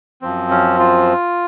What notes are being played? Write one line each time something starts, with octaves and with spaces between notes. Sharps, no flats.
F#2 F3 C4
C#4
F4